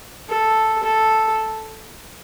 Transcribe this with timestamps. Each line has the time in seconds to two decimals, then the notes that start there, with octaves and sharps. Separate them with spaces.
0.29 A4
0.83 A4